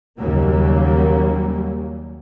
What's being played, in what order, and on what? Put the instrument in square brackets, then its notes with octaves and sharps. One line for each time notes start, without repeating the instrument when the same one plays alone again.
[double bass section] D#2 C#3 F#3 G3 A#3